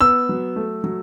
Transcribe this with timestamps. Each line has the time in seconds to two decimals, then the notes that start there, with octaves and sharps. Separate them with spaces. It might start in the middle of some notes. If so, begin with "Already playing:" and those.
0.01 B3 E6
0.29 F#3
0.56 A3
0.84 F#3